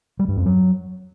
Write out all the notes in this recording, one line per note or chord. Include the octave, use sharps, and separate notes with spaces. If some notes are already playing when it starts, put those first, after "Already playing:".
G3
G2
F2
F#3